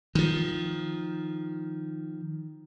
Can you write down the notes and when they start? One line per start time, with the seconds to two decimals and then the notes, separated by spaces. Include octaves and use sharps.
0.15 D#3 F3